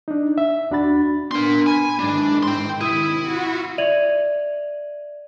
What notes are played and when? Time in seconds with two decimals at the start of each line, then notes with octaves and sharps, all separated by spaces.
0.08 D4 D#4
0.38 E5
0.71 D#2 D4 F#4 B5 A6
1.31 B3 D4 A#4 C6
1.67 G#5 B5
1.99 G#2 D#3 E3 D4
2.43 G5 C6
2.81 C3 D#3 E4 D#6 D#7
3.27 F#4
3.78 D5 E5 G#6 D#7 F7 F#7